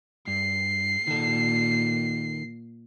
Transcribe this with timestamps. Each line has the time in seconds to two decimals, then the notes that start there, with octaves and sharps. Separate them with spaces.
0.27 G2 C7
1.07 A#2 D#3 A4